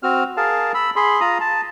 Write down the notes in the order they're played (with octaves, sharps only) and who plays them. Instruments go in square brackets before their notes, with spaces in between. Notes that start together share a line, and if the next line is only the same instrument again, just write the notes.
[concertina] C4 F#4 F6
G#4 A#4 F5 A5
B5 E6
G#4 B5 C6
F4 A#5 D#6
A5